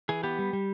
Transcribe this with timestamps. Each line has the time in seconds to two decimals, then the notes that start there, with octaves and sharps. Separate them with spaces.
0.09 E3 G#4
0.23 B3 G4
0.39 G3
0.53 G3